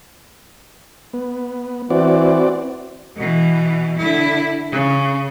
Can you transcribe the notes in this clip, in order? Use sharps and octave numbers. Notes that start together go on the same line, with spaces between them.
B3
E3 C4 F#4 D5
B2 E3
D3 E4
C#3